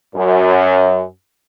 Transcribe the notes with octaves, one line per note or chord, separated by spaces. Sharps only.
F#2